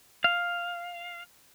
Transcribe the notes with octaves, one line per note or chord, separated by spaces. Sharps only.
F5